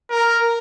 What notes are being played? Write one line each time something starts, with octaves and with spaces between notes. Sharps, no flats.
A#4